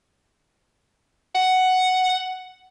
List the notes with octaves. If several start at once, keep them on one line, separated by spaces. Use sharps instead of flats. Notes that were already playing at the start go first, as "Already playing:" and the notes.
F#5